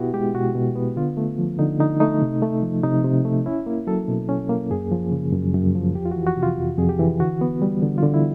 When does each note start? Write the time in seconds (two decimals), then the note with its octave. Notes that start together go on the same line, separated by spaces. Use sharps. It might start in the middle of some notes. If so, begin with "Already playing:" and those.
Already playing: B2 B3 E4 F#4 G4
0.13 G#3 G4
0.35 B2 F#4
0.55 B2
0.76 B3
0.96 D3 F4
1.17 A3
1.38 F3
1.59 D3 D#4
1.80 D3 D#4
2.00 A3 D#4
2.22 C3
2.42 A3
2.62 F3
2.84 C3 D#4
3.04 C3
3.25 A3
3.46 C#4 E4
3.66 A#3
3.87 F#3 A4
4.08 B2
4.29 C#4
4.49 A#3
4.71 F#2 G#4
4.91 F3
5.12 C#3
5.33 F#2
5.54 F#2
5.75 F3
5.95 F2 G4
6.06 F4
6.11 E3 F#4
6.27 F#4
6.37 C3
6.43 F4
6.58 F2
6.78 F2 G#4
6.89 G4
6.99 E3
7.20 D3 F#4
7.41 B3
7.62 G3
7.82 D3
7.98 F4
8.03 D3
8.14 E4